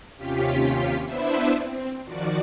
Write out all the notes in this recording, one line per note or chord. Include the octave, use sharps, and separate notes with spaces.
D#2 C3 C#4 F4 G4 B6
B3 D4 E4 B4 C5 E5
C4
D#3 F3 F#4 D5